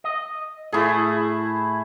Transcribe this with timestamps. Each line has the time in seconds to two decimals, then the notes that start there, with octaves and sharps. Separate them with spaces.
0.04 D#5
0.72 A2 A3 E4 G#4